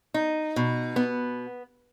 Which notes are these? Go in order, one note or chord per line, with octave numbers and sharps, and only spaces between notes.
D#4
B2
B3